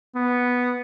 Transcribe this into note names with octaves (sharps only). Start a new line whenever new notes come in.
B3